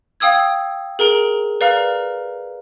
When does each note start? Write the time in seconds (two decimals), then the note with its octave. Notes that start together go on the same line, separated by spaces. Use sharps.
0.20 F5 G5 D#6 E6 G#6
0.99 G#4 A#4 A#5 D7 G7
1.61 B4 D5 F5 A#5 F6